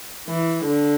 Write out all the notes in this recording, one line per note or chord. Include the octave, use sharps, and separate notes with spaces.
E3
D3